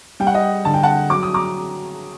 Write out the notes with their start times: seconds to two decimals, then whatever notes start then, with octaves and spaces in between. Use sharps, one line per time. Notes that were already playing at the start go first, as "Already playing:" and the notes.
0.20 G3 G5
0.27 F#5
0.35 D#5 G5
0.65 D3 A5
0.74 G5
0.83 F#5 A5
1.10 F#3 D6
1.23 D#6
1.34 A#5 D6